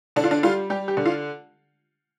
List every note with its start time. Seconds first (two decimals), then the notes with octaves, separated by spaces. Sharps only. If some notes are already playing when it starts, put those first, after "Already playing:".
0.16 D3 D4
0.24 F4
0.31 D4
0.43 G3 F4
0.70 G3 G4
0.88 G4
0.97 D3
1.06 F4